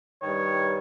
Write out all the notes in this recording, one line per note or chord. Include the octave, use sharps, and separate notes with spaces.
G2 D#3 C#5